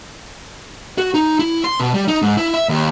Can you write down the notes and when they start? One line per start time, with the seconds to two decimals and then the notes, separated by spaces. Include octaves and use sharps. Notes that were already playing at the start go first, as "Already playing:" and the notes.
0.98 F#4
1.14 D#4
1.39 E4
1.64 C6
1.80 B2
1.94 G3
2.08 D#4
2.22 G#2
2.37 E4
2.54 E5
2.69 D#2